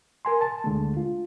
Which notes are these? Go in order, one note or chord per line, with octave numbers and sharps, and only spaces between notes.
A#4 G#5 C6
A5
D2 D3 G#3 A3
F4